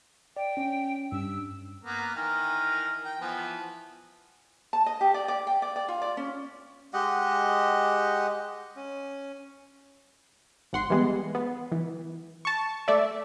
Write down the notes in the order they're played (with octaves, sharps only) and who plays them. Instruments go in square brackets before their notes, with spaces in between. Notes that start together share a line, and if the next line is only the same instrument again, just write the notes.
[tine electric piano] D5 [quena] G5
[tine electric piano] C#4
[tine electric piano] G2 [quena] E6
[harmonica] A#3 B3
D#3 E3 A#4
G5
E3 F3 B3
[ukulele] A5
D#5
G4
D5
D5
G5
D5
D5
F4
D5
C#4
[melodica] G#3 G4 D#5 F#5
C#4
[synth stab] G#1 F#5 C6
E3 G3 G#3 B3
B3
E3
A5 C#6
A3 D5 E5